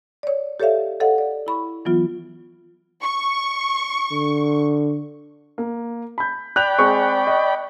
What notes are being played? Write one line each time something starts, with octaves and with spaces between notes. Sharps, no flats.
C#5 D5
G4 A4 C#5 D5 E5 F5
A4 C#5 D#5 F5 F#5
D5
E4 B5 C#6
E3 F#3 B3 F4
C#6
D3
A#3
B5 G6
D5 G5 B5 F#6 G6 F7
G#3 C4 G#4 C#6
D#5